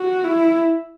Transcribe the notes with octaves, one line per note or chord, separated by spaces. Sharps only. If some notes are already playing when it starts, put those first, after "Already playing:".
Already playing: F#4
E4